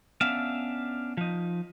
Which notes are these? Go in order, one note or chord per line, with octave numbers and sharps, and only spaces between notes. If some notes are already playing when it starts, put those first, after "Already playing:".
B3 C#4 D4 E5 F5
F3 D#4